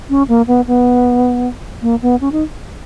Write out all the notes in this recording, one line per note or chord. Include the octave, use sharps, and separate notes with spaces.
C#4
A#3
B3
B3
A#3
B3
C#4
D#4